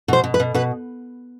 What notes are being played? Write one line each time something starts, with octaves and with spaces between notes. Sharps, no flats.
B2 C5
B2
B4
B2
B2 B4